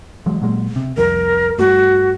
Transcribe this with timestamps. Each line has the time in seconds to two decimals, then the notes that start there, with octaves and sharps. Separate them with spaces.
0.26 E3 F#3 G#3
0.42 A#2 F#3 G#3
0.76 C3
0.97 C2 F2 A#4
1.58 G2 A3 F#4